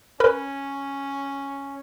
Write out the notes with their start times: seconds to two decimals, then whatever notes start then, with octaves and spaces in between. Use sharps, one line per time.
0.20 C#4 A#4 B4 B5